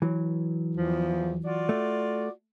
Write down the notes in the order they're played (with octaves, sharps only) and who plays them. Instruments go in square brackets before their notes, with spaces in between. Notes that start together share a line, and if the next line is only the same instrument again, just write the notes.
[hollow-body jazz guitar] E3 F#3
[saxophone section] E2 F3
F4 F#4 D5
[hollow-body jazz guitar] A3